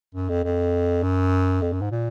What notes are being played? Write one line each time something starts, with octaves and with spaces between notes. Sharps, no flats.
F#2
F2
F2
F#2
F2
F#2
G#2
A#2